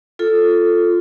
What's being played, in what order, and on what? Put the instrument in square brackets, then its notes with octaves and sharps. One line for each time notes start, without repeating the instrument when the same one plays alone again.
[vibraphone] F4 A4